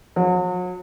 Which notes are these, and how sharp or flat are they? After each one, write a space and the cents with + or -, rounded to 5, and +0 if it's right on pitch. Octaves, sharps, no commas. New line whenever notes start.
F#3 -40